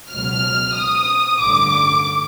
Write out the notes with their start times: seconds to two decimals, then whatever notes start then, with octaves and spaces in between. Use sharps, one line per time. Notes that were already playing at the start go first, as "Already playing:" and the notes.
0.12 C#2 B2 F#3 F6
0.76 D#6
1.40 A1 G2 D3 D6